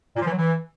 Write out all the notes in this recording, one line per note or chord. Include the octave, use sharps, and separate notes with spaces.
A#2
F3
E3
F#3
E3